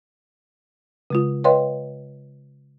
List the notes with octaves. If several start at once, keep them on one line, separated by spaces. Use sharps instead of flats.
C#3 G#3 F4
B4 C#5 D#5 F5 G5 C6